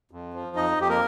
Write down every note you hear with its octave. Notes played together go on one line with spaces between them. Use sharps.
F2
F3
F2 D#4 D#5
F2 G4
A#3 A#4